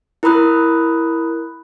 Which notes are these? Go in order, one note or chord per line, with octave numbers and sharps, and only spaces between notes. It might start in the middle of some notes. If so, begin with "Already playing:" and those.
E4 A#4 A#5 B5 D#6 F#6